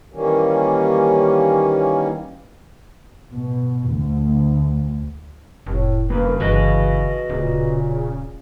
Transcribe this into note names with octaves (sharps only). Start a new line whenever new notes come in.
D#3 E3 G3 A#3 C#4
B2
D2
F1 A2
G2 C#3 A#3 B4
G1 C#3 E3 F#4 B4 D#5
D1 A#2 C#3